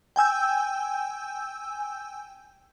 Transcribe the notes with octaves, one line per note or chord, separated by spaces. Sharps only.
G5 G#5 E6 G6